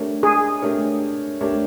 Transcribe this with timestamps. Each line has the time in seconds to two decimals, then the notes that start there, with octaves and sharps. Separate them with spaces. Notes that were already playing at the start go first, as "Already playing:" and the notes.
Already playing: A3 D4 G4 A#4 C#5
0.23 G#4
0.62 A3 D4 G4 A#4 C#5
1.41 A3 D4 G4 A#4 C#5